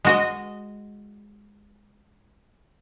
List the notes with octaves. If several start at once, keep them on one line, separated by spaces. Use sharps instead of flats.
G#3 F#4 D#5